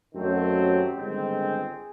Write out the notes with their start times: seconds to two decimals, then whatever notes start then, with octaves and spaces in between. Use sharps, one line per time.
0.14 F#2 D#3 F#3 A3 C4
0.55 G4
0.96 G1 G2 D#3 G#3 C4
1.37 G#4